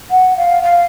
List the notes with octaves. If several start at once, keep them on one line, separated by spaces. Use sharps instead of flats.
F#5
F5
F5